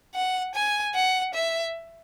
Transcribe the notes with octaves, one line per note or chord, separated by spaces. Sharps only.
F#5
G#5
F#5
E5